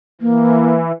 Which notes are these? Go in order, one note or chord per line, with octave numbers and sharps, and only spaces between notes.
E3 A#3